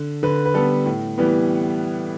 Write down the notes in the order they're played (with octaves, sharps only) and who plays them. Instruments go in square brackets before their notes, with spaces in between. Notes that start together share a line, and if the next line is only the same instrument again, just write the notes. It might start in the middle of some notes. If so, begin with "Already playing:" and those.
Already playing: [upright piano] D3
D3 B4
B4
G3 B3 A4
A2
E3 G3 B3